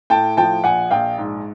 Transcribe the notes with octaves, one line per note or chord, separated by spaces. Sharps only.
A2 G5 A5
F3 G5 A5
A#1 F#5 G#5
A#1 F5 G5
G#2